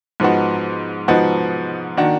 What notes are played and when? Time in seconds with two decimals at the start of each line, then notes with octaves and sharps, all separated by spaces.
0.20 G#2 F3 B3 D#4 F#4
1.08 G#2 F3 B3 D#4 F#4
1.97 D#3 A#3 D4 F#4